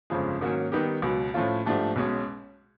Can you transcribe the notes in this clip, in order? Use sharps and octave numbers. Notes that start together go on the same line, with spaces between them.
G1 F2 C#3 F3 G#3
G#2 D#3 F#3 A#3 C#4
D#3 G3 B3 D#4 G4
C#2 B2 F#3
A2 F3 A3 C#4 F4
G#2 F3 A3 D4 G4
B1 B2 G#3 C#4